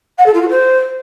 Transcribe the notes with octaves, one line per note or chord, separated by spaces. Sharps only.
F#5
A4
F4
F#4
C5